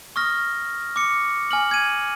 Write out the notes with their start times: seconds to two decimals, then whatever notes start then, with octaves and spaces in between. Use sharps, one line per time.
0.16 C#6 D#6 F6 A#6
0.96 D6 C#7
1.51 G#5 F6 F#7
1.71 G#6 D#7